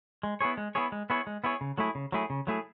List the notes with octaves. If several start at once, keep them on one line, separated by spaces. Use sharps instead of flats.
G#3
B3 E4 G#4 C#5
G#3
B3 E4 G#4 C#5
G#3
B3 E4 G#4 C#5
G#3
B3 E4 G#4 C#5
C#3
F#3 A3 E4 G#4
C#3
F#3 A3 E4 G#4
C#3
F#3 A3 E4 G#4